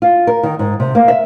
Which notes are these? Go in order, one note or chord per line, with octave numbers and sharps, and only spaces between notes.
F4
A#4
D#3
G#2
C3
A#3
E5